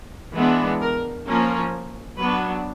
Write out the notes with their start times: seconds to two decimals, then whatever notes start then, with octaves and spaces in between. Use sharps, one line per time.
0.34 E3 G#3 B3 D4
0.81 A#4
1.26 F3 A#3 C#4 A#4
2.18 F#3 B3 D4 B4